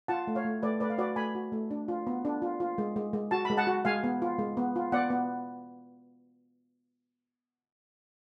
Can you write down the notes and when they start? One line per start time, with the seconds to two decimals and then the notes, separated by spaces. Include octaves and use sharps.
0.08 F4 F#5 A5
0.27 A3
0.35 C#5 F5
0.45 A3
0.62 A3 B4 D5
0.80 A3 B4 D5
0.90 F5
0.98 F#4 B4 D5
1.16 A3 G#5 B5
1.35 F#4
1.52 A3
1.71 D4
1.88 F4
2.07 B3
2.25 D4
2.42 F4
2.60 F4
2.78 G#3
2.96 G#3
3.13 G#3
3.31 F#4 A5
3.45 G#3 B5
3.57 F#5 A5
3.67 F#4
3.85 G#3 F5 G#5
4.04 B3
4.22 F4
4.39 G#3
4.57 B3
4.76 F4
4.92 B3 D5 F#5
5.10 B3